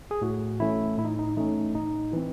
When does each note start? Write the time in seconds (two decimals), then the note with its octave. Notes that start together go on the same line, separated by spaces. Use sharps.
0.11 G#4
0.22 A2 F#4
0.60 E3 A3 C#4 E4
0.98 A2 E4
1.05 D#4
1.19 D#4
1.36 E3 A3 C#4 D#4
1.74 A2 D#4
2.12 E3 C4 E4